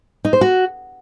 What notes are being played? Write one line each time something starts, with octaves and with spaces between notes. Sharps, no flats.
D#4
C5
F#4